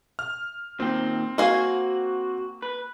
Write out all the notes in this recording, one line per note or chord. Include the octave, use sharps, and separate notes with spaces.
F6
A#2 D#3 C4 G5
A#3 F#4 F5 G#5
B4